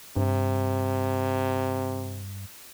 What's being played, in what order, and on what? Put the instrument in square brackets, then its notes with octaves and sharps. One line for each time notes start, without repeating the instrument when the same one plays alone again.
[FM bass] G2 [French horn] C3